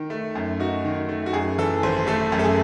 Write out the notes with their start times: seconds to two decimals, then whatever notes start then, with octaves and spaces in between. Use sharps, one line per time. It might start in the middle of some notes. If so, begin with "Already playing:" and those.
Already playing: D#3
0.10 A3
0.35 F#2
0.60 D#4 F#4
0.85 D#3
1.09 A3
1.26 F#4
1.33 F#2 G#4
1.58 E3 A4
1.83 G#1 C5
2.07 A3 A4
2.32 F#2
2.39 A4
2.44 G#4